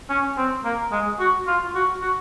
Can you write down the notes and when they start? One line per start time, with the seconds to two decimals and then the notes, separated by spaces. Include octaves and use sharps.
0.09 C#4
0.38 C4
0.65 A#3
0.92 G#3
1.19 F#4
1.47 F4
1.75 F#4
2.02 F#4